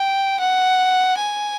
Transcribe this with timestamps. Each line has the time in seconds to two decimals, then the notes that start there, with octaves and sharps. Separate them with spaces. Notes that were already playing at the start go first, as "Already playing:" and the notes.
Already playing: G5
0.40 F#5
1.18 G#5